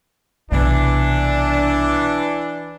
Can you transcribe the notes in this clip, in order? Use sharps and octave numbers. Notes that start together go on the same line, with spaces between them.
B1 C3 E3 D4